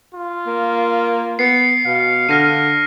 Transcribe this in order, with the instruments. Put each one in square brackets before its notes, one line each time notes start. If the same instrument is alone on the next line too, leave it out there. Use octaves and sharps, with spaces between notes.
[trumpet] F4
[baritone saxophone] A#3
[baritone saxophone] B3 [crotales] C7 C#7
[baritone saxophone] B2 [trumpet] F5
[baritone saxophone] D3 [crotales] F6 A#6 D#7